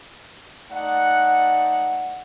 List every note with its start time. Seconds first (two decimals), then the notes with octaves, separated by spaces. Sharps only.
0.71 A3 D#4 D5 F#5